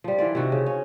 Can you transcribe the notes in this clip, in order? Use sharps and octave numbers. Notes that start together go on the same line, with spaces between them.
F3 G3
E3 F4 D5
C3 D#3 F3 F#4
C#3
C#4